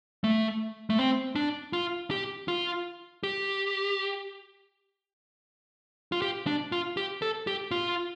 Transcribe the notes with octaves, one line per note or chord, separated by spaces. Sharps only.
A3
A3
C4
D4
F4
G4
F4
G4
F4
G4
D4
F4
G4
A4
G4
F4